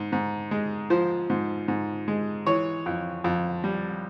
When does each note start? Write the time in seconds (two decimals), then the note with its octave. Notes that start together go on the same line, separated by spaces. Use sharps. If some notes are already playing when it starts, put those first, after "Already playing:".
Already playing: G#2
0.12 G#2
0.51 G#3
0.90 F3 C5
1.30 G#2
1.68 G#2
2.08 G#3
2.47 E3 C#5
2.86 F2
3.24 F2
3.64 G3